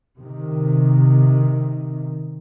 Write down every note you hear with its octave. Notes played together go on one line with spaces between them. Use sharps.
C3 D#3